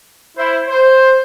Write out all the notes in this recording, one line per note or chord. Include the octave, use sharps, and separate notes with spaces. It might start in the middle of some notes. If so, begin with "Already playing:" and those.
E4 C5
C5